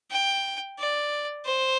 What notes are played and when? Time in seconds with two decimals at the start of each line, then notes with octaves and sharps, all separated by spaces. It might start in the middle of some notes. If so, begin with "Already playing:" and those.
0.11 G5
0.79 D5
1.46 C5